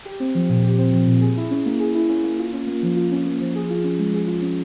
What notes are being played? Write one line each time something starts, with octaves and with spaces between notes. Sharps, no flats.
G4
C4
F3
A#2
G4
C4
F3
A#2
G#4
E4
C#4
A#3
G#4
E4
C#4
A#3
F4
C#4
A#3
F3
F4
C#4
A#3
F3
G#4
F4
C#4
G#3
G#4
F4
C#4